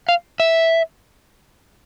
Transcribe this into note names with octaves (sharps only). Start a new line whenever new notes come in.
F5
E5